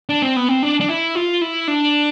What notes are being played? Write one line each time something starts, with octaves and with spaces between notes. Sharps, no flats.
D4
C4
B3
C4
D4
D4
E4
F4
E4
D4